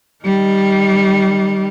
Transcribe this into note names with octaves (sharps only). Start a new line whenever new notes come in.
D#3 G3